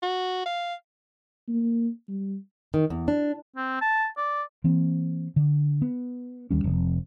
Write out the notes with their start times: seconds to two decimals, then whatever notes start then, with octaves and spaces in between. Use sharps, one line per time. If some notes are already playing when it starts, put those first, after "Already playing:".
0.03 F#4
0.46 F5
1.48 A#3
2.09 G3
2.74 D#3
2.90 E2
3.08 D4
3.56 C4
3.81 A5
4.17 D5
4.64 E3 A#3 C4
5.36 D3
5.82 B3
6.51 D#2 G3 C#4
6.64 F1 F2